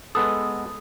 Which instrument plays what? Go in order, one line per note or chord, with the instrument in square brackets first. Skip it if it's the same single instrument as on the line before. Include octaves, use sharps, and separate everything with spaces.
[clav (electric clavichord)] G#3 B3 A4 [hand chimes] D#6